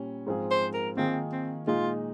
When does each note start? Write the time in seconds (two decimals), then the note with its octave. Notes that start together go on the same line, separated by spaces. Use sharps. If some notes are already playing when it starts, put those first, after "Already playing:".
Already playing: A#2 G3 C#4
0.27 G#2 F3 C4 F4 G#4
0.51 C5
0.74 A#4
0.97 D#3 A#3 C4 F4 G#4
1.32 C4
1.67 A#2 G#3 D#4 F4 G#4